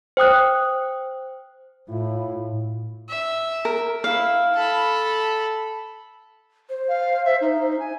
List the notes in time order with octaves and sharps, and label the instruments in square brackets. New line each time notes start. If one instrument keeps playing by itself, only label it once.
[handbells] C5 G5 D#6 F#6
[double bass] A2 [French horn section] E4 F4
[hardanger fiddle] E5
[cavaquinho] A#4
[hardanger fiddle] E4 [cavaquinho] F5
[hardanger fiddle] A4 B5
[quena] C5
[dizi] F5
E5
D#4
G#5